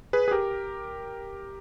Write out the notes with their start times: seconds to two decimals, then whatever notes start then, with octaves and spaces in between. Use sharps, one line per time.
0.13 G#4 B4
0.28 G#4
0.31 G4 A#4